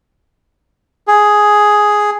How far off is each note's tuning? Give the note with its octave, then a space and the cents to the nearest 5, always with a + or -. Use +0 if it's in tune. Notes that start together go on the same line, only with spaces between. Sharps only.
G#4 +5